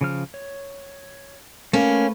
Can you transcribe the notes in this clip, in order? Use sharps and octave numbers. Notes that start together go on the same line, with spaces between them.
C#3 F3 F6
C#5
A3 A#3 C#4 B4